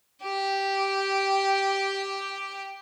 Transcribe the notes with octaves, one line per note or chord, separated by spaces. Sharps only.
G4 G5